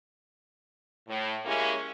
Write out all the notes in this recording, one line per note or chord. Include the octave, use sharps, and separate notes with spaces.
A2
G#3 A#3 C#4 E4 G4